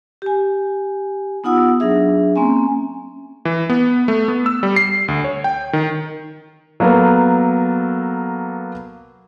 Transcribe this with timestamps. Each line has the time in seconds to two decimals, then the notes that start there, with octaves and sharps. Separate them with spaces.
0.22 G4 G#5
1.44 B3 D#4 F4 F#5 D#6 E6
1.80 F#3 D4 G#4 E5
2.36 A#3 C4 C#4 G#5
3.45 E3
3.70 B3
4.08 A3
4.28 B3
4.46 E6
4.63 G3
4.76 C7
5.08 D2
5.24 C#5
5.44 G5
5.73 D#3
6.80 F#3 A#3 B3 A4 A#4